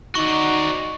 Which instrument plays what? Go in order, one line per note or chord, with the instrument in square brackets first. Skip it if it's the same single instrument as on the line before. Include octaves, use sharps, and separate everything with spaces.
[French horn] D#4 [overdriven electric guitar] F#4 D5 [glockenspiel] C#6